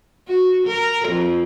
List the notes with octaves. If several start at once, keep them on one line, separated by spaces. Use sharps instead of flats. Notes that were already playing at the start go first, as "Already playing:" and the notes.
F#4
A#4
F2